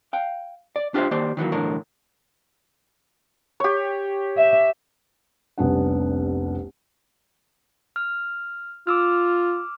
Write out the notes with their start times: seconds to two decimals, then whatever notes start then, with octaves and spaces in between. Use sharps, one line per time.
0.13 F5 G5
0.76 D5
0.94 D4 F4 G4 A#4 C5 E5
1.11 D#3 A#3 G4 C5 D5
1.37 D#3 E3 F#3 A#3
1.52 B1 E2 A2 D3 A#4
3.60 G4 C#5
4.37 E5
5.58 F1 C2 B3 C#4 D4 F#5
7.96 F6
8.87 F4 D6 E6 F6